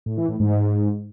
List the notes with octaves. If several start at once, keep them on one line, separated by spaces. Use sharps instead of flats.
A2
E3
A2
G#2